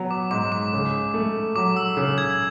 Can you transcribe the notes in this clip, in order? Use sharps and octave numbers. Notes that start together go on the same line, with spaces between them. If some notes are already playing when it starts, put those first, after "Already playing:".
Already playing: F#3 B3
D6
G#2 D6
D6
C#3
A3
F#3 D6
E6
C#3
G#6